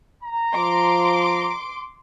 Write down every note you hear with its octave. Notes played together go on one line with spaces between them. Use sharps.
A#5
F3 C6 D6